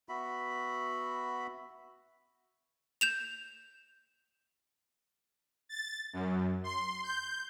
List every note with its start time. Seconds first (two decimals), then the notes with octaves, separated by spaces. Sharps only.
0.09 B3 F#4 E5 B5
3.01 G6 E7 F7
5.69 A6
6.13 F#2
6.64 C6
7.03 G6